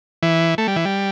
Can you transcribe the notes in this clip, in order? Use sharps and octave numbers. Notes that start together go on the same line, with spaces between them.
E3
A3
G3
E3
G3